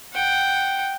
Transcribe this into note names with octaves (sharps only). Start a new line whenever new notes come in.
F#5 G5